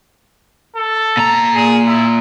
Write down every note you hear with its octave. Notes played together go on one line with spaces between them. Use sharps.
A4
A#2 A#5
G#4
E4